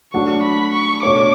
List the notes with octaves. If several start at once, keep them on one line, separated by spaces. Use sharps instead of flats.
F#3 A3 D4 F#4 C#6
B5
C#6
B2 A3 D4 A4 C#5 D6